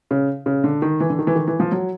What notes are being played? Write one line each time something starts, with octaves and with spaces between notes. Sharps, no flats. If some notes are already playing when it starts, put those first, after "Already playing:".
C#3
C#3
D3
D#3
E3
D3
D#3
E3
D#3
E3
F3
F#3